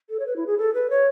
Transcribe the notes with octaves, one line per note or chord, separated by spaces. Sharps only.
A4
C#5
B4
E4
G#4
A4
B4
C#5